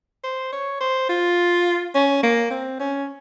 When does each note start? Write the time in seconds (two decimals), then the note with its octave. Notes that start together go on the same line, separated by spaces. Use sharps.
0.24 C5
0.52 C#5
0.81 C5
1.09 F4
1.95 C#4
2.23 A#3
2.51 C4
2.80 C#4